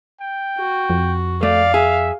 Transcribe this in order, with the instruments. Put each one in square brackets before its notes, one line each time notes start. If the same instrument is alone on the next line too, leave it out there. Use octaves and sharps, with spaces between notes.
[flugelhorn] G5
[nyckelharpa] F#4
[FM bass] F2
[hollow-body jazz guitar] A3 [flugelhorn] D5 [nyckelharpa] F5
[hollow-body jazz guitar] G#4 [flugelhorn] E5